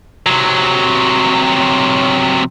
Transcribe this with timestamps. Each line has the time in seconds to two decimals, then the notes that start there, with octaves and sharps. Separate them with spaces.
0.27 C3 F#3